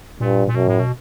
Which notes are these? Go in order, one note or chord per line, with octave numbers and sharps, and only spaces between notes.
G2 A#2
A#2
F#2 B2
A2
B2